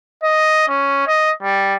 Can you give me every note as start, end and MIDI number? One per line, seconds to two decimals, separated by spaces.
0.23 0.67 75
0.68 1.07 61
1.07 1.31 75
1.43 1.75 55